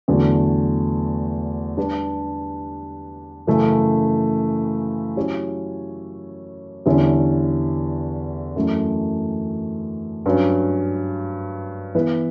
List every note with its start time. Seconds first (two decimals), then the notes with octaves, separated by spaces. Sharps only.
0.08 E2 D3 F#3 A3
1.77 G3 D4 G4 B4
3.47 F#2 C#3 E3 A3
5.16 F#3 C#4 E4 G4 C#5
6.86 E2 D3 G3 C#4 E4
8.56 F#2 E3 A3
10.26 G2 F#3 C#4
11.95 E3 B3 E4 B4